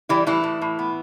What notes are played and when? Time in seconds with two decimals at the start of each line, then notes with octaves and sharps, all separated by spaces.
0.09 E3 G3 E4
0.27 A2 E3 E4
0.44 A2
0.62 A2
0.79 B3